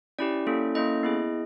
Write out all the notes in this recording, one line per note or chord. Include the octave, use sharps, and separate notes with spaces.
C#4 E4 G4 D5
A#3 C#4 E4 A4
A#3 C#4 E4 A4 D#5
B3 E4 G#4